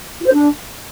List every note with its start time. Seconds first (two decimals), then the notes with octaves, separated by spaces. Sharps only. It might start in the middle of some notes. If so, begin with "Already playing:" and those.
0.21 F4
0.26 C5
0.32 D4